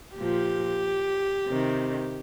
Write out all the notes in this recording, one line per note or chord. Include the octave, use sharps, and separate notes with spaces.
A#2 F3 G4
C3 D#3